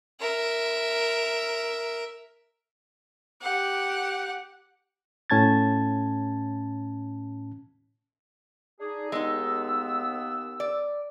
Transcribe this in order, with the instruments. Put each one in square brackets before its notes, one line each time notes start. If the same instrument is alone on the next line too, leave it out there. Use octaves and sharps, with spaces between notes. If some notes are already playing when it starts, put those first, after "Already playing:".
[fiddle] A#4 E5
[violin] G4 F#5
[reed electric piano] A2 C#4 A5 G#6 A6
[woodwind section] D4 D#4 G#4
[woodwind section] D#2 B3 E6 [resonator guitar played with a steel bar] G#3 D#4
[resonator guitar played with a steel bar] D5